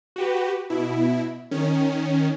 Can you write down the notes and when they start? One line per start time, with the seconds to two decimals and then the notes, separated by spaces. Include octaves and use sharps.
0.16 F#4 G4 B4
0.70 B2 E4
1.51 D#3 C#4